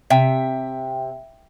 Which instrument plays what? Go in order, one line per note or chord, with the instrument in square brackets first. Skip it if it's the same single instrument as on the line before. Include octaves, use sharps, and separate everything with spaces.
[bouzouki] C3 [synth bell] E5 G5